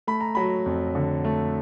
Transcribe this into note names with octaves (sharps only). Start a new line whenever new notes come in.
A3 B5
A#5
F#3 B5
F2
D3
A3